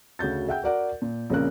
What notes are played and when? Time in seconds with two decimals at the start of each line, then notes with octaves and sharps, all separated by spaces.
0.19 D2 C#3 F#4 G6 A6
0.48 G#4 E5 F#5 G5 G6
0.63 F#4 A#4 D5 F#5
1.02 A#2
1.30 A#1 C#3 C4 C#4 A#4 F#6